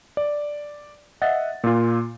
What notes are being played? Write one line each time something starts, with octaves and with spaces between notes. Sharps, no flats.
D5
D#5 E5 F#5 A6
A#2 F4